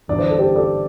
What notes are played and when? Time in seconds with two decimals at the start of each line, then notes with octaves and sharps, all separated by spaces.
0.08 G1 G2 E3 D5
0.18 C5
0.29 A4
0.38 G4 C5
0.56 A4 D5